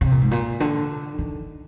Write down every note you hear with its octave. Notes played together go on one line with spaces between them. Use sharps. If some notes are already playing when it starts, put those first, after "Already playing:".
C3
A#2
G#2
A#2
D3
D#3